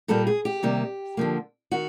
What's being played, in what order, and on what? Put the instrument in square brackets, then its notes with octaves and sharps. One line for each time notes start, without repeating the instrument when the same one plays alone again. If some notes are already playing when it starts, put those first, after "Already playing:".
[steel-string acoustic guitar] A#2 G3 A#3 A4
G#4
G4
C3 D#3 G3 A#3
D3 F3 A#3
D#3 F#4